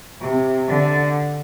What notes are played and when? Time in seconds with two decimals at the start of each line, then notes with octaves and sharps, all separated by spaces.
0.21 C3
0.68 D3